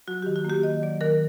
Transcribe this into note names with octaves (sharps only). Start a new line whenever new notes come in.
F#3 F#4
G4
D#3
F#4
A#3
G4
D#3 D#5
F#3 D5
D#3 A#4